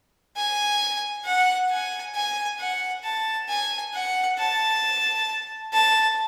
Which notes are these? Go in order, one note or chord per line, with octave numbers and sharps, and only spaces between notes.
G#5
F#5
G#5
G#5
F#5
A5
G#5
F#5
A5
A5